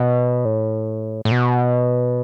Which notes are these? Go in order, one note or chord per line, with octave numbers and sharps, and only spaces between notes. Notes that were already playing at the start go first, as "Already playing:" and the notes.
Already playing: B2
A2
A2
B2